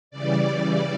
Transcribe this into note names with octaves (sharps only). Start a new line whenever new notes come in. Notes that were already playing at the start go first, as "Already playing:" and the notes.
C#3 E3 G3 D5